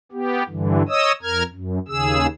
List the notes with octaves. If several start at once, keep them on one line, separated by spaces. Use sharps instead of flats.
B3 G4
G2 D3 E3
C#5 D#5 D#6 E6
F2 A#4 F6 G#6
F#2
D#2 C#3 G#4 E6